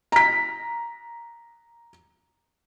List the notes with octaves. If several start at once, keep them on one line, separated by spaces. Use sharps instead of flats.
A#5 B6